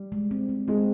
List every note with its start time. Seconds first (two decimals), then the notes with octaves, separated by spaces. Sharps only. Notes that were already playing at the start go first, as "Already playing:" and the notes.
Already playing: G3
0.12 G#3
0.31 C4
0.49 C4
0.68 G#3 C4